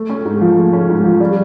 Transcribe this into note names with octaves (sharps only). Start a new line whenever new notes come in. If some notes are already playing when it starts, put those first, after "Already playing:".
Already playing: A3
C#4
G#2
F3
A3
C#4
G#2
F3
G3